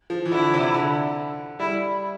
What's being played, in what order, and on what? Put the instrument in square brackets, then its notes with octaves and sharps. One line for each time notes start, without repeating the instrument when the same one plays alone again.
[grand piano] F3
E3
[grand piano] D3 [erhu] E4
[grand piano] C3
D3
[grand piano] G3 [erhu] E4